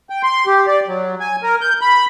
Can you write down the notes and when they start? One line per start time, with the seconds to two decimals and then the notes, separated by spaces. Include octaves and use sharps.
0.10 G5
0.23 C6
0.46 G4
0.67 D5
0.88 F#3
1.20 G#5
1.43 A#4
1.61 G6
1.81 B5